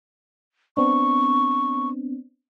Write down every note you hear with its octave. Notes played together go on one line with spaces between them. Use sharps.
B3 C4 D4 C#6